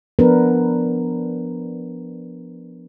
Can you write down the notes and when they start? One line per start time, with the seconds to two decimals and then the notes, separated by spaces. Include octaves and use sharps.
0.19 F3 B3 D4 A#4 B4